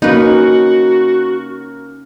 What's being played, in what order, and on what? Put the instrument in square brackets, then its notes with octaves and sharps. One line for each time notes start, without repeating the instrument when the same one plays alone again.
[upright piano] A#3 [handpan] C#4 [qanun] D#4 B4 [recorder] F#4